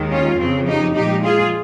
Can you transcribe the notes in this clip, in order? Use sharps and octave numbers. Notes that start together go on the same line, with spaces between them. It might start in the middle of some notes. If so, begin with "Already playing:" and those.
Already playing: D#2 D#3 G#3
C#4 F4
F2 C#3 F3 C4
D#4 G4
A#2 F3 G#3 D#4 G4
F4 G#4